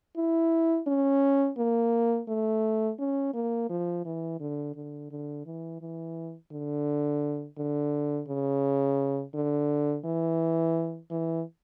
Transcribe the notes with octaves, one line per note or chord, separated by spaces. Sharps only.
E4
C#4
A#3
A3
C#4
A#3
F3
E3
D3
D3
D3
E3
E3
D3
D3
C#3
D3
E3
E3